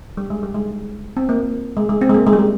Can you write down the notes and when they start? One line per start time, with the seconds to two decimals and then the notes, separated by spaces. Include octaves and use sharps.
0.17 G3
0.30 G#3
0.43 G3
0.55 G#3
1.17 C4
1.29 A#3
1.77 G#3
1.89 G#3
2.01 C4
2.10 G#3
2.14 A#3
2.27 G#3
2.33 G3
2.38 G#3